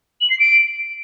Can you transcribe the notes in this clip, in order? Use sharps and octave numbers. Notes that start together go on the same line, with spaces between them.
F#7
C7
D7